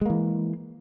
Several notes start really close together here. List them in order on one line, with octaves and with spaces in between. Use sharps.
G#3 A#3 E3